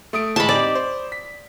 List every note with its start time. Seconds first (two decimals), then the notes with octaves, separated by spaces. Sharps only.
0.13 A3 D#6 D7
0.36 A2 E3 G#3 A5 B5
0.49 C4 D#4 G4 D5
0.75 C5
1.12 B6